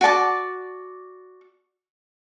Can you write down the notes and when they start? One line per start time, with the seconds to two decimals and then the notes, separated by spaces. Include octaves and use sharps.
0.01 F#4 D5 A5 D6